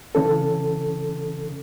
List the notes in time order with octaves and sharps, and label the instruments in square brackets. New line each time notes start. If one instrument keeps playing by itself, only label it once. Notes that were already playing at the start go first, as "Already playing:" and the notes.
[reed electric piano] C#3 E3 C#4 A4